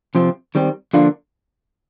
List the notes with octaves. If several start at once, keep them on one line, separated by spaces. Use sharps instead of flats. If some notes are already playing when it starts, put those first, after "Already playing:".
C3 F3 C4
D#3 G3 C4
D3 F3 A#3 D4 F4